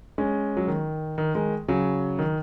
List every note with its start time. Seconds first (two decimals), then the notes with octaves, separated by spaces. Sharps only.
0.18 G#3 C#4
0.57 F#3
0.68 D#3
1.18 D#3
1.35 D#3 G#3
1.68 C#3 F#3
2.19 D#3